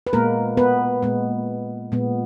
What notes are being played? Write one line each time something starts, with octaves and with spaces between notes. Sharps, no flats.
B4
A#2 G#3 A#3 B3 A#4
B3 B4
A#2 G#3 B3
A#2 G#3 B3